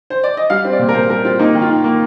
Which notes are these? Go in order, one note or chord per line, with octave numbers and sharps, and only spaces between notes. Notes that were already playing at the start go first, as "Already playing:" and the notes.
C5
D5
D#5
G3 F5
C4
D5
A#2
A#4
A#2 C5
G3 A#4
C4 F4
A#3 D#4
D#3
F4
D#3
A#3